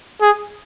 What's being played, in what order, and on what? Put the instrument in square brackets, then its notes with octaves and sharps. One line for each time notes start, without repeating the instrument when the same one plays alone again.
[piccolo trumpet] G#4